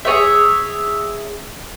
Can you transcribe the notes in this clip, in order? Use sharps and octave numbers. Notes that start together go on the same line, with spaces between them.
G#4 C#5 E5